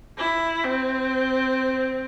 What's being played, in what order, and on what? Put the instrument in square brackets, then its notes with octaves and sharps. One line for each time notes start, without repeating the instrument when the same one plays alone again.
[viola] E4
C4